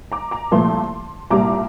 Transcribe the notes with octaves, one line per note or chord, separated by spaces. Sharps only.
A#5 D6
A#5 D6
C2 A#2 F3 A3 A5 C6
C2 A#2 G3 A#5 D6